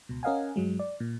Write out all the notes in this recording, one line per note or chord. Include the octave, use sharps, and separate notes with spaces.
C#2 B2
C#4 A#4 D#5 F5 F#5 G#5
G2 F#3 G#3
D5
A#2